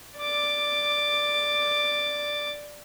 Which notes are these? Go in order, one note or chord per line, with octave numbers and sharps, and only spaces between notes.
D5 D6